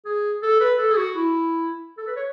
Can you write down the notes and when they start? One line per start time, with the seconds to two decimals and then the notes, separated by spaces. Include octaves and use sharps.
0.06 G#4
0.43 A4
0.60 B4
0.78 A4
0.92 G#4
0.97 F#4
1.16 E4
1.98 A4
2.07 B4
2.16 C#5